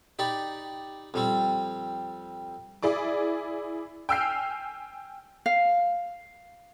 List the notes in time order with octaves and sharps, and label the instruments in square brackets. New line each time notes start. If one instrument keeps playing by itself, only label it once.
[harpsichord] D#4 G4 D5 B5
F2 G3 C4
[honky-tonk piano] E4 G#4 D5 D6
G5 G#5 E6 F6 G6 C7
[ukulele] F5